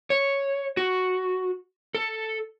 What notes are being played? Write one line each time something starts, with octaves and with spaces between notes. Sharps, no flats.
C#5
F#4
A4